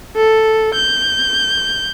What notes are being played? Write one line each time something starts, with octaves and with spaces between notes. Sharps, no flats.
A4
G6